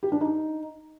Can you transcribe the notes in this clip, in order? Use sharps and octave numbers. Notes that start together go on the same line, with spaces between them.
G4
D4
D#4